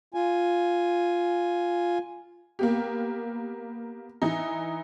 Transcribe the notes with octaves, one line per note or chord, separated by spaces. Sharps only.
F4 G#5
A#3 B3 G4
E3 D#4